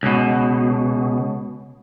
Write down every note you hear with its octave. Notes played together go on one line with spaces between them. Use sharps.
C#2 B2